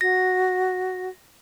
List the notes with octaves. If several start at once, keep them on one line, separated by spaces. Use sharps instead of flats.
F#4 A#6